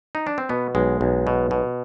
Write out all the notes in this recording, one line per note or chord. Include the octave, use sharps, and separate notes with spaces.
D#4
D4
C4
B2 B3
B1 G#3
B1
B2
B2